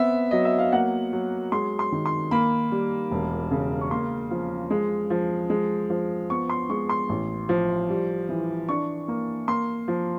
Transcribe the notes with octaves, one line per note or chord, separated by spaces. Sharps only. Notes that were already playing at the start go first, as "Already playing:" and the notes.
Already playing: B3 C4 E5
F#3 D#5
E5
F5
A#3 F#5
F#3
G#3 C6
C6
D#3
C6
A#3 B5
G3
E1
C#3
C#6
A#3 C6
F3
G#3
F3
G#3
F3
B3 C#6
C6
G#3 C#6
C6
A1
F3
G3
E3
D4 C#6
A#3
A#3 C6
F3